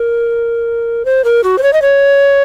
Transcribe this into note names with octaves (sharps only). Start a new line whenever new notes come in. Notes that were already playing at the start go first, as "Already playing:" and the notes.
Already playing: A#4
C5
A#4
F#4
C5
C#5
D#5
C#5